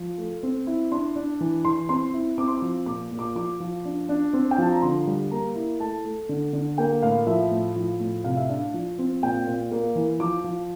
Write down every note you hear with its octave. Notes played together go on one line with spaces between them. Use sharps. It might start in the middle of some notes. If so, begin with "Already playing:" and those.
Already playing: F3
A3
C4
E4
D4 C6
D4
E3
E3 C6
C4 C6
E4
C4 D6
C6
D6
F3
A#2 D6
A#2
D6
F3 D6
F3
D4
D4
C4
G5
F3 A5
A#5
D3 C6
G3
A#3 A#5
E4
A3 A5
A3
D3
D3
A#3 G5
A2 F5
F3 E5
A2
F3
A2
C3 F5
E5
D4 F5
F3
C4
A#2 G5
A#2
A#3
E3
F3 D6
F3